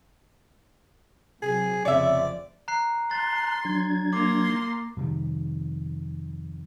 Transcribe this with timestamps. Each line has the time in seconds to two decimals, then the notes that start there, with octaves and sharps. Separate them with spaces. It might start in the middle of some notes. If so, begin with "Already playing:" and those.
1.42 C3 F#3 G#4
1.85 F1 C#3 C4 C#5 D5 E5
2.68 A#5 F#6 C7
3.11 A5 A#5 C6 F#6 A6
3.65 F#3 D4 G#6
4.13 A#3 C6 D6
4.97 F2 C3 D#3 G3